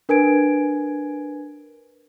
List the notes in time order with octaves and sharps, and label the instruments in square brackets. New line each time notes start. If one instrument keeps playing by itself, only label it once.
[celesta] D4 A#4 B4 G#5 G#6 D7